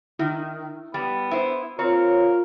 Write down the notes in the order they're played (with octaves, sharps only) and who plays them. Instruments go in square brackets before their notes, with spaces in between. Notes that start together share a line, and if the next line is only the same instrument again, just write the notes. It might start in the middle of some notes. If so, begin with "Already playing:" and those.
[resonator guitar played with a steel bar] D#3 [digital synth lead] E4
[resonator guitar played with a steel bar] G3 [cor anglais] B3
[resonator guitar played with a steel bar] E4 C5
[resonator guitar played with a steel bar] C4 [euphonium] F4 [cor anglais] A#4 [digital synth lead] C#5